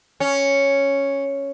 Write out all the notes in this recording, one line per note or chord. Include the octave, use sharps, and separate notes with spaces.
C#4